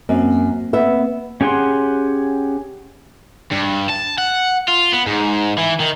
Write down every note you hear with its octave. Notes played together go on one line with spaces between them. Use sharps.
F#2 A#3 C4
B3 E5
C#4 G4 G#4 F#5 C6
G2
A5
F#5
F4
B3
G#2
E3
D#3